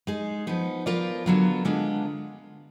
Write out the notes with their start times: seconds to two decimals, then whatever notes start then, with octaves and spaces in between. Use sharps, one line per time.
0.07 G#3 D#4 G#4
0.47 F3 B3 D#4
0.86 F3 B3 F4 A#4 D5
1.26 D3 F#3 B3 F4 A#4
1.65 D3 G#3 B3 D4 F4